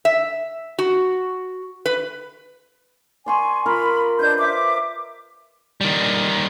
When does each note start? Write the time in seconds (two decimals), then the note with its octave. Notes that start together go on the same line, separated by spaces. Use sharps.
0.05 E5
0.79 F#4
1.86 B4
3.26 D5 G#5 C6 C#6
3.66 F4 A#4 B5
4.19 D4 B4 C5 D#5 G6
4.40 E5 D6
5.81 D#3 G3